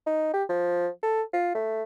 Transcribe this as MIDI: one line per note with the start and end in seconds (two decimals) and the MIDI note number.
0.07 0.34 63
0.34 0.44 67
0.49 0.88 53
1.03 1.22 69
1.33 1.50 65
1.55 1.83 57